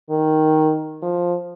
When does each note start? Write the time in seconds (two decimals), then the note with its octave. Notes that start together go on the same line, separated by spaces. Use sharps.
0.10 D#3
1.02 F3